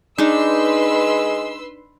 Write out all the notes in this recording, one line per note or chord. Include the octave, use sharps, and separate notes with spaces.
G#3 D4 D#4 B4 C6 E6